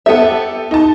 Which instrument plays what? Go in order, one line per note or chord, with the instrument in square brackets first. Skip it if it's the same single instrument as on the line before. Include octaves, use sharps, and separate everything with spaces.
[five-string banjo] B3 E5 [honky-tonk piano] G4 A4
[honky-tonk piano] D#4 A5